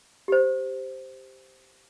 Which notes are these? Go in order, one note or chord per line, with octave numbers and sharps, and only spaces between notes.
G4 C5